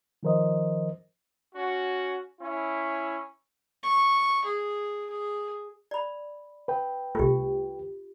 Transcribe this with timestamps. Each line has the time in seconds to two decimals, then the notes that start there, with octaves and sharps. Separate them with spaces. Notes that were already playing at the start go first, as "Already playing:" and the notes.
0.23 D#3 F3 A#4 C5 D#5
1.55 C#4 F#4
2.40 C#4 E4
3.83 C#6
4.45 G#4
5.10 G#4
5.91 D5 B5
6.68 B4 G5
7.15 C2 A3 F4 G4